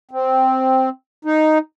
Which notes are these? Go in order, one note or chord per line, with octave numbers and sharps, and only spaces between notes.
C4
D#4